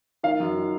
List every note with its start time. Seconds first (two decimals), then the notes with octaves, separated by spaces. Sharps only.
0.23 D#3 F5
0.40 F#2
0.57 D#3